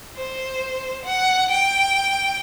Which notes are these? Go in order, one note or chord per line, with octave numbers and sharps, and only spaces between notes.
C5
F#5
G5